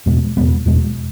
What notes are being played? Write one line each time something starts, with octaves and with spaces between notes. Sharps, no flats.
E2 B2 G#3 B3
E2 B2 G#3 B3
E2 B2 G#3 B3